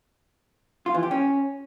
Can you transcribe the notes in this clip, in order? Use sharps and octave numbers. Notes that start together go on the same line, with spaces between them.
F4
E3
G4
C#4